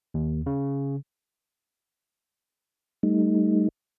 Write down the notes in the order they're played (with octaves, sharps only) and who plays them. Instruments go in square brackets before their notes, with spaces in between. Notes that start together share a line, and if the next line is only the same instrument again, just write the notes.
[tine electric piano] D#2
C#3
[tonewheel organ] G3 A3 D#4